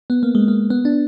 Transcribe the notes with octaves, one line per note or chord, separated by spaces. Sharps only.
B3
A#3
G#3
A#3
B3
D4